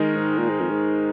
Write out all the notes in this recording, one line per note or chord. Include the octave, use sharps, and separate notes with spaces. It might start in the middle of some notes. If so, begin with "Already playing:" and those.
Already playing: D#3 G#3 D#4 A#4
G#2
A#2
G#2
F2
G#2